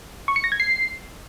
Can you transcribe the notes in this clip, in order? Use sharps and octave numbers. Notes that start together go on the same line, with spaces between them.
C#6
C#7
A#6
G#6
C7